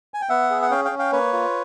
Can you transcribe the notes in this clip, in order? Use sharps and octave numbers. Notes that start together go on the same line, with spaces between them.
G#5
G5
B3 E5 F#5
G#4
F#5
C#4 F5 G5
F5 G5
C#4
F5 G5
A#3 B4 C#5
F4